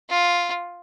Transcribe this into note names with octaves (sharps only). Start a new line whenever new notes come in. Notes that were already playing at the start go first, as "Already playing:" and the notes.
F4